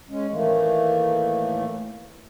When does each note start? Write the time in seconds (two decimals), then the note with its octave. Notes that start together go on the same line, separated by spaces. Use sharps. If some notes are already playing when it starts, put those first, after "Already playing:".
0.10 G#3 C#4
0.31 A2 D#3 E3 A3 A#3